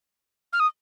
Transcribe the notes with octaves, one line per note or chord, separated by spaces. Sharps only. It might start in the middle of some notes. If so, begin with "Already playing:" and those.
F6
D#6